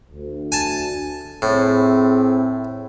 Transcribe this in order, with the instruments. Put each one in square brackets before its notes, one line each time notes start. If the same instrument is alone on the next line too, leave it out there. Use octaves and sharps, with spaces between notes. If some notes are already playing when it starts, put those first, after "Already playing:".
[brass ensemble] D2
[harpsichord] G#5 A5
[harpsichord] A2 [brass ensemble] C4 E4 G#4